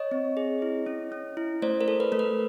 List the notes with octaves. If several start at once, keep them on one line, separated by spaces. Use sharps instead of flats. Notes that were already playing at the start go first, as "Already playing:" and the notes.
Already playing: C#5 D#5
C4
G#4
E4
C#4
C#4
E4
A3 C5 D5
A#4 C5
A4
B4
A3 A#4
B4